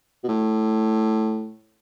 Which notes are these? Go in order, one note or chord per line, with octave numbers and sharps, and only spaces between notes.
B2
A2